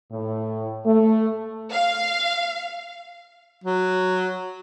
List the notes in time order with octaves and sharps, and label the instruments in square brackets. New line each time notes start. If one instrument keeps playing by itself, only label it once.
[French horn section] A2
A3
[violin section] F5
[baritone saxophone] F#3